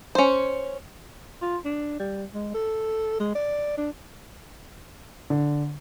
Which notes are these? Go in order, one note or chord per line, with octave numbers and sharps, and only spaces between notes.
C#4 C5
F4
D4
G3
G#3
A4
G#3
D5
D4
D3